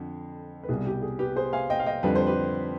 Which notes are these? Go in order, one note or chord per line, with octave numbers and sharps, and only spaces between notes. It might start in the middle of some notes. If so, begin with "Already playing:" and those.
Already playing: F2 D3
B4
C2 B2 G3 G#4
G4
G#4
G4 B4
G#4 C5
F5 G#5
D#5 G5
F5
D#5 G5
F2 D3 G3 B4
C5
G4 B4